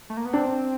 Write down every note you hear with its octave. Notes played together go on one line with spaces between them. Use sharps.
A3
A#3
B3
C4 D4